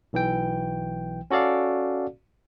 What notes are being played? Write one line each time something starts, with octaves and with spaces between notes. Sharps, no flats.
B1 E3 G5
C#4 F#4 A4 D5 F5